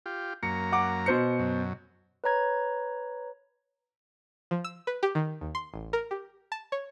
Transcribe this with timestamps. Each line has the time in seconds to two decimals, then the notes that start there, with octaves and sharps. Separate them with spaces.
0.06 F4 G4
0.43 F#2 A#3 A#5 C#7
0.72 F#5 D6
1.06 B2 C5 C#7
1.39 F#2
2.24 B4 C#5 A#5 G#6
4.51 F3
4.64 E6
4.87 B4
5.03 G4
5.15 D#3
5.41 D#2
5.55 C6
5.74 A1
5.93 A#4
6.11 G4
6.52 A5
6.72 C#5